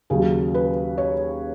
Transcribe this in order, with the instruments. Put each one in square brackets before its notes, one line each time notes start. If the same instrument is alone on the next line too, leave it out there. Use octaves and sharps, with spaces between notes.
[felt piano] D#2 C#3 F#3 G#4
B4
C#5